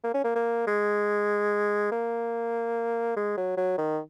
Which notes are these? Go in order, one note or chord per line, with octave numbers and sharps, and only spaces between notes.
A#3
C#4
A#3
A#3
G#3
A#3
G#3
F#3
F#3
D#3